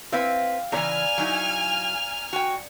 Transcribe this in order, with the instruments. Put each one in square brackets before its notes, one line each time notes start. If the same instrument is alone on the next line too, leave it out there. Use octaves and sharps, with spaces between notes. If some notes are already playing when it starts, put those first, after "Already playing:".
[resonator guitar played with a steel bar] C4 E4 B4 [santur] F5 G5
[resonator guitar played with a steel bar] A2 C#3 E3 [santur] D5 A#5 [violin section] G#5 F6
[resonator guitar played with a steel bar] F#3 D#4 E4
F#4 G5